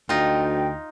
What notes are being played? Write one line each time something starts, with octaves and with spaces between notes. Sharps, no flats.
D2 D#4 F4 G5